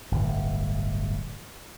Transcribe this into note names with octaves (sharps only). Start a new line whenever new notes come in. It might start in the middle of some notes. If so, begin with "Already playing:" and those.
D1 G1